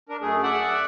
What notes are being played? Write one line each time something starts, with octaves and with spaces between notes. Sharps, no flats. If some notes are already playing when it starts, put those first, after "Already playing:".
D4 A#4
F#2 A3 G#4
D5 E5 F#5